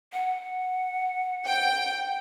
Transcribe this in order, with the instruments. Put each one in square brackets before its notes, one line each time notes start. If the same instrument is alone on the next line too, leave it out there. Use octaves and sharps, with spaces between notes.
[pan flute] F#5
[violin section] G5